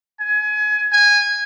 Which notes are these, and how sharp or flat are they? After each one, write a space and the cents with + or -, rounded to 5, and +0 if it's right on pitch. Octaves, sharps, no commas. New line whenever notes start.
G#5 +30
G#5 -15